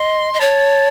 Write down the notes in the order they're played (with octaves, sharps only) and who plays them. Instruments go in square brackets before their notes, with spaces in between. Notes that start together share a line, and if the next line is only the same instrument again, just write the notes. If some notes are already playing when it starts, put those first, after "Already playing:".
Already playing: [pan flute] D#5 [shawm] C6
[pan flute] D#5
[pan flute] C#5 [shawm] A5